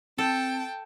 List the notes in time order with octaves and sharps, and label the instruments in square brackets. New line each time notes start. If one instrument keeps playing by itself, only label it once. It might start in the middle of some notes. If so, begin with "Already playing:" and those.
[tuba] C4 [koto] A4 [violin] G5 A5